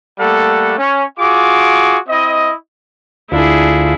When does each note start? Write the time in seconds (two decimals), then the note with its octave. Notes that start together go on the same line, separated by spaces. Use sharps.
0.19 G3 A3 A#3 A4 F#5
0.78 C#4
1.19 F4 F#4 G#4 D6
2.09 C4 E4 D#5
3.32 D2 D4 E4 F4 G#4